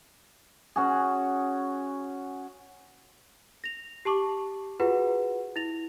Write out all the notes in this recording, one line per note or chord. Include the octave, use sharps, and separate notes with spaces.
C#4 F#4 G#4
A#6 F7
G4 A5 C#6 D6
F4 F#4 G#4 B4 F#5
E4 A#6 F7